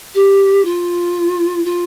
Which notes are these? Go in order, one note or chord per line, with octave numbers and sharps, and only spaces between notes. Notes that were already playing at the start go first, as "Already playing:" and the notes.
G4
F4
F4